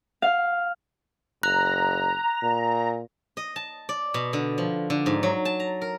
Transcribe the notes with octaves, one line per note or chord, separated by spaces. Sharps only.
F5
F#1 A#5 F#6
A#2
D#5
A5
D5
B2
D3
F3
D3
G#2
F#3
A5
A#5
A#4